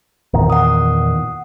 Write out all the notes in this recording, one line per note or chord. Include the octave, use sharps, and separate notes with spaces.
E2 A#2 D#3
F#5 D#6